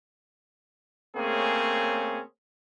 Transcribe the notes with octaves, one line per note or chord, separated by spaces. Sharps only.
C#3 A3 A#3 C4 C#4 G#4